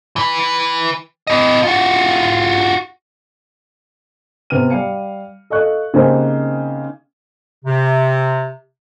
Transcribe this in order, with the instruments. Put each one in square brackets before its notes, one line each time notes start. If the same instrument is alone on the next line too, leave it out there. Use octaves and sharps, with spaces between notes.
[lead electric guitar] E3 B4
E3 D#5
F4 F#4
[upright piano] C3 B3 F6 D#7
G3 F5 C#7
A4 D#5 F5 C#6 F#6
C#3 A#3 C4 D#4 G4 C5
[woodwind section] C3